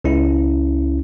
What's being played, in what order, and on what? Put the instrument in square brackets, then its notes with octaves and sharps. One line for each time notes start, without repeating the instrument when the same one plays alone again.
[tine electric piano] C#2 C#4 E4